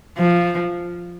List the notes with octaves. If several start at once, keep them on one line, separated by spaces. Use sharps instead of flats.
F3